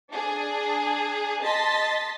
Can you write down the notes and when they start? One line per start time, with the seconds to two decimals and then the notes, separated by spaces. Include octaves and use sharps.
0.11 D4 G#4
1.43 D#5 A5 C6 A6 B6